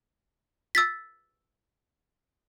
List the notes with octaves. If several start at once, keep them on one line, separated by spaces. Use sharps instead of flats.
E6 A6 B6